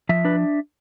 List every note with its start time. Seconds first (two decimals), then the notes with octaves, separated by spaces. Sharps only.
0.09 F3 E5
0.25 D4 B4